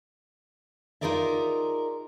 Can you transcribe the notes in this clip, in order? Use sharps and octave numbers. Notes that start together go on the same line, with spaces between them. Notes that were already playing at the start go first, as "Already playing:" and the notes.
D#4 F4 G#4 A#4 D5 E5